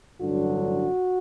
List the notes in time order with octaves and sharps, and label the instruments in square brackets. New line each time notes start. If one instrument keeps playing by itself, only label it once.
[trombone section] A1 G2 D3 F#3 F#4